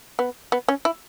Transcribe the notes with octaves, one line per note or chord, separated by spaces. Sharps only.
B3
B3
C#4
E4